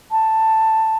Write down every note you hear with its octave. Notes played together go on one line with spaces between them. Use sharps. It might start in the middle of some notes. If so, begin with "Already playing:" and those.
A5